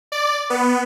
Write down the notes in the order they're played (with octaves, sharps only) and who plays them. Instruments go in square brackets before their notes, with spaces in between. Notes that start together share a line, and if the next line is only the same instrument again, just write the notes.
[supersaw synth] D5
B3